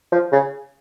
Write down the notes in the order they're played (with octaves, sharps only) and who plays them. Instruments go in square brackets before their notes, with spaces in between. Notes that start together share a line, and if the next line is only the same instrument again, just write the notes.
[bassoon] F3
C#3